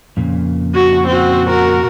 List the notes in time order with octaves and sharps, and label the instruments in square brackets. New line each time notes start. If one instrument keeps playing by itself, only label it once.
[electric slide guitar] F2 A#2 C#3
[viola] F#4
C4 F#4
F#4 A#4